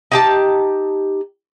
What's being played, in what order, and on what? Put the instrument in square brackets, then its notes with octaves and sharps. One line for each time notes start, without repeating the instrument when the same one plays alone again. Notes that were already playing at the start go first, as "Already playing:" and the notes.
[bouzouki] D#4 G4 A5